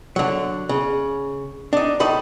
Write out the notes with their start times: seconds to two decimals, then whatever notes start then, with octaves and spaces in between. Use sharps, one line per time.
0.16 D3 F#3
0.69 C#3
1.73 D4 D#4
2.00 C#2 A3 D#4 A5 B5